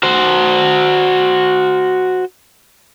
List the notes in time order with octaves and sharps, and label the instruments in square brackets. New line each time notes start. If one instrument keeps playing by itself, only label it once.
[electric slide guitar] F#4 C5